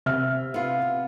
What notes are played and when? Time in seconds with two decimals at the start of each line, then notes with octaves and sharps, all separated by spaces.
0.06 C3 E5 F6
0.54 B3 F4